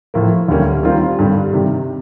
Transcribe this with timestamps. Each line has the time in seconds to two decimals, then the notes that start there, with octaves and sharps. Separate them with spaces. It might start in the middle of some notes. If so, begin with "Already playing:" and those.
0.14 A2 F3 A#3
0.48 D2 D3 G3 A#3 C#4
0.83 D#3 G3 C4 F4 A#4
1.19 G2 D3 G3
1.53 C3 D#3 G3